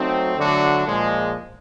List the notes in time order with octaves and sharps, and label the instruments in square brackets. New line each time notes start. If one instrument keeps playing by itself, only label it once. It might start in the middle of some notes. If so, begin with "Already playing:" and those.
Already playing: [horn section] F#3 A3 C4 D#4
D3 F#3 A3 D4 F#4
A#2 F3 G#3